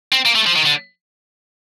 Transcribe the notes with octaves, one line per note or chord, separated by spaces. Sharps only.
C4
A#3
A3
F3
D#3
D3